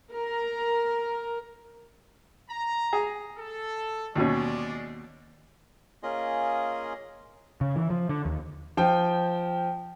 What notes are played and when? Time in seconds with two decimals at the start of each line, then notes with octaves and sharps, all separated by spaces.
0.12 A#4
2.50 A#5
2.93 G#4
3.38 A4
4.16 D#2 B2 G#3 C#4 D5
6.03 A#3 C#4 F4 G#4 D#5
7.61 C#3
7.76 E3
7.90 F3
8.09 D3
8.25 D#2
8.77 F3 G5